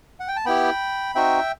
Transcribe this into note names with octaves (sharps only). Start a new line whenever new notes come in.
F#5
G5
A5
B3 E4 G4 G5 B5
C4 D#4 F#4 E5 G5